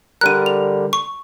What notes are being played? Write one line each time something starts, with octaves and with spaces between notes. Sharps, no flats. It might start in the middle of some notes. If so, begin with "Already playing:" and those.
D3 G3 A#4 F#6 D#7
F7
C#6